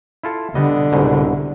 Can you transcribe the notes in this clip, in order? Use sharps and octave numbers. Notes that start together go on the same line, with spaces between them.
E4 F4 A4
D3 G3 B3 D#5
C2 G#2 B2